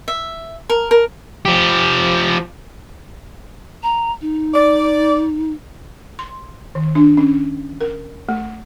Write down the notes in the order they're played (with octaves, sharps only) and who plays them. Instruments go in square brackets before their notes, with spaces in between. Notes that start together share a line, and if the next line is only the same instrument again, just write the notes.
[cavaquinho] E5
A#4
A#4
[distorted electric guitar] F3 G4
[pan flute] A#5
D#4
[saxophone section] D5
[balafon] C6
D#3
D4
C#4
A#4
A3